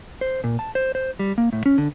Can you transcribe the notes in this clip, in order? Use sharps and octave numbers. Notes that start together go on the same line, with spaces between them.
C5
A#2
A5
C5
C5
G3
A#3
A2
C#4
D3